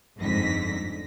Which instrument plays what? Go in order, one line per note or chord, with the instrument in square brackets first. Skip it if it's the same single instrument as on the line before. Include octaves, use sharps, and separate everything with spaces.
[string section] G1 F2 G#2 D3 A#6 B6